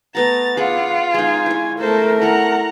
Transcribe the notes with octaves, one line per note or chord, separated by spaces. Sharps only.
A3 B3 F#5 A#5 A6
F4 G#4 D5 F#5 B5
G#3 D#4 G#5
E4 C#5
A3 A4 A#4 C5
E4 A4 F#5 A#5